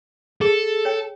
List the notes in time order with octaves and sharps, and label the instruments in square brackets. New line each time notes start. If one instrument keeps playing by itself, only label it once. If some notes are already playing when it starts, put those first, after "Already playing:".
[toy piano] G#4 [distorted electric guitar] A4
[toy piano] C#5 G5